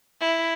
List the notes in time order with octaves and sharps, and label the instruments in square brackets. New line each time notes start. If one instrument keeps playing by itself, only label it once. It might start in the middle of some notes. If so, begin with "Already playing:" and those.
[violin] E4